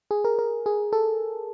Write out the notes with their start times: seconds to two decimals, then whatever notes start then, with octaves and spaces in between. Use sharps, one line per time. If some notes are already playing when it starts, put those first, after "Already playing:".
0.11 G#4
0.24 A#4
0.39 A#4
0.66 G#4
0.93 A4